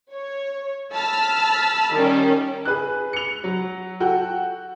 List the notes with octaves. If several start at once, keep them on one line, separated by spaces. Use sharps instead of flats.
C#5
A5 B5 E6 F6
D#3 G3 C#4
G#4 B4 F#6
C#7 F7
F#3
F#4 A4 G5